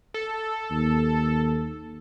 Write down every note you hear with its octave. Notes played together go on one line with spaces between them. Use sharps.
A4
D#2